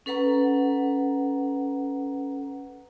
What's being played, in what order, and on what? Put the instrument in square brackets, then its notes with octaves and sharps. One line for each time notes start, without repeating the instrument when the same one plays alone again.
[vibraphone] C#4 A4 B4 F#5 A#5